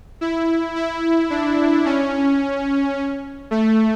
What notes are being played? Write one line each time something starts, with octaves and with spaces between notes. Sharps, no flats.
E4
E4
D4
C#4
A3